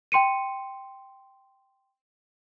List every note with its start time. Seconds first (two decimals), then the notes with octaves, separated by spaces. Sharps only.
0.12 G5 C6 C#7 D#7